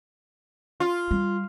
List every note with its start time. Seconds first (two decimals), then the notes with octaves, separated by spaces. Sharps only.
0.80 F4
1.11 G3